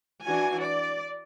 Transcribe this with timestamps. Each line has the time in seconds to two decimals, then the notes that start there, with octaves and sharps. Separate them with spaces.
0.24 E3 D4 F#4 G#5
0.63 D5